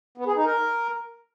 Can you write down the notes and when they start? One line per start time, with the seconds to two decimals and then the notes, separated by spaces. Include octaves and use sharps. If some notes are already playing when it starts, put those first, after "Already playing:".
0.18 B3
0.27 G#4
0.36 D#4
0.45 A#4